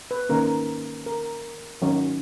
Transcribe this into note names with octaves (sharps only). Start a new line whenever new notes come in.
B4
D#3 A#3 C#4 A#4
A#4
D#3 F#3 C#4